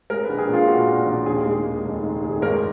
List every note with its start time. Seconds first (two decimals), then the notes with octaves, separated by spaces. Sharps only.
0.10 G#3 A#4
0.24 B4
0.29 A#1
0.38 G#4
0.48 A#2 F4
0.68 A#2 F#4
0.88 A#2
1.06 A#1
1.26 D#2 G#4
1.46 G#3
1.65 D#2
1.85 F1
2.03 D#3
2.24 G#3
2.33 G#4
2.42 G#1 A#4